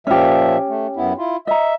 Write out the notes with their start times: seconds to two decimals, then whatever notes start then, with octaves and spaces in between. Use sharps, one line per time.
0.07 A#2 F3 C#4 G4 E5
0.69 A3
0.96 F#2 B3 E4
1.18 E4 F4
1.47 D#5 E5 A#5